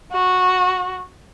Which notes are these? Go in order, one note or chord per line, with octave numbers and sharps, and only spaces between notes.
F#4